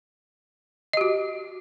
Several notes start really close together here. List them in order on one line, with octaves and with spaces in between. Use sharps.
D#5 G4 F#4